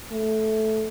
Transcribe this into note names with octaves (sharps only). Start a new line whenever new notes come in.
A3